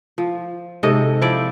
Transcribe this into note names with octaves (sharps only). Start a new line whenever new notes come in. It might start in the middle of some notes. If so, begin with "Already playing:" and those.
F3
G#2 C3 A4 D#5
F3 E4 D5 G5